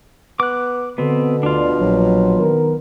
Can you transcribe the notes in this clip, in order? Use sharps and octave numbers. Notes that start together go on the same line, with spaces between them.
B3 D6 F#6
B2 D3 B3 C4
D2 D4 F4 D5
A#1 F#3
D#3 B3 A#4